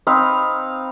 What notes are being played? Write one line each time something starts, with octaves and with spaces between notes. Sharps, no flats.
C4 D#4 F5 B5